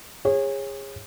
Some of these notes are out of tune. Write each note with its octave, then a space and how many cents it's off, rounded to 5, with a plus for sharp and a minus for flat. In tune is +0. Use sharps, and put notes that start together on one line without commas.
G#4 -30 C#5 -25